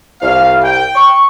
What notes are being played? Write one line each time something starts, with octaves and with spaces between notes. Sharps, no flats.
C2 F5
G5
C#6